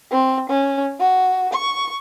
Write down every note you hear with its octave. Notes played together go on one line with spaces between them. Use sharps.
C4
C#4
F#4
C#6